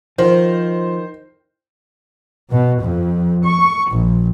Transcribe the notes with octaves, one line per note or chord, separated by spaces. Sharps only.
D#3 F3 C5
B2
F2
C#6
A#1